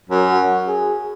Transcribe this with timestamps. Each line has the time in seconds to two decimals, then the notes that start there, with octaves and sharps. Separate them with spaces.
0.09 F#2
0.29 F#4
0.67 G#4